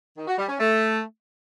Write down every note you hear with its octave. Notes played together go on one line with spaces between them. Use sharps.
D#3
F#4
G3
C#4
A3